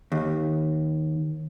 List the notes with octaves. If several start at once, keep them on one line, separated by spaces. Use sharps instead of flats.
D#2